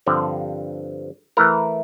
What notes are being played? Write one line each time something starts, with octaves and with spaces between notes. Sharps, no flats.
G2 D3 F3 C4
E3 A3 E4 A#4